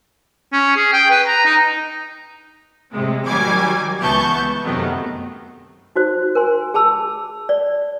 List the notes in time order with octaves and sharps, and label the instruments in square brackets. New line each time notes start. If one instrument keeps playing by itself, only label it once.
[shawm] C#4
G#4
G5
B4
A#5
D#4
[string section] A2 C3 G#3
D#3 F#3 G3 G#5 D6 G#6
C#2 E3 B3 A5 C#6 G6
F#2 C3 D#3 F#3 A3 B3
[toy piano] D#4 F#4 C5
A#4 G#5 C6
G#4 A5 B5 E6
D5